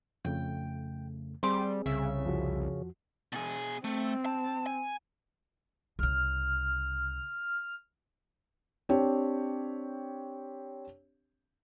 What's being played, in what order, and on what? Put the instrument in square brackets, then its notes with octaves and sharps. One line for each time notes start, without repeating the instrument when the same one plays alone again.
[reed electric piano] F2 C#3 A3 [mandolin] G5
[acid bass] G3 [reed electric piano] C4 G#4 [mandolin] C6 D6
[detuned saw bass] C2 [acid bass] C#3 [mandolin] E5
[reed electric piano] F2 F3 F#4
[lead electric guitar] B2 G#4
[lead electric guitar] A3 [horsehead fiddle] C4
[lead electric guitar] A5
G#5
[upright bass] C2 C#3 [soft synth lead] F6
[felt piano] C4 D4 G4 C#5